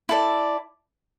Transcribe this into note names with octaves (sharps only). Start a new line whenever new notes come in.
E4 A4 D5